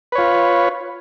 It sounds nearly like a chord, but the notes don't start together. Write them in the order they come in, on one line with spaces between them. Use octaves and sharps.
B4 C#5 F4